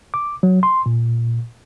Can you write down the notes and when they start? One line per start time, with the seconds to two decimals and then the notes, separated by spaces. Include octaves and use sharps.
0.14 D6
0.43 F#3
0.63 C6
0.86 A#2